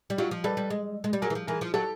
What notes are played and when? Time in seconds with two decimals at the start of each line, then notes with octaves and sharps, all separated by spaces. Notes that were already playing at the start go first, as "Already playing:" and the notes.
0.10 G3
0.18 F#3 F4 G4
0.31 F3
0.44 G3 A4 B4
0.57 G3
0.70 G#3
1.04 G#3
1.13 G3
1.22 F#3 G#4 A#4
1.30 E3
1.35 F3
1.47 E3 G#4 A#4
1.61 F3
1.74 F#3 G4 A4